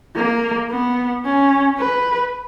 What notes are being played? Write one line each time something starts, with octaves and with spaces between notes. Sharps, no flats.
A#3
B3
C#4
B4